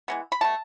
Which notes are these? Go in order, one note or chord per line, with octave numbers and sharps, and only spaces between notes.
E3 G#3 B3
B5
B2 A3 A5